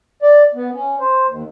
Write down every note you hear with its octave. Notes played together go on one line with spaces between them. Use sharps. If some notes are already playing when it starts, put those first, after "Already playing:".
D5
B3
C#4
C5
D#2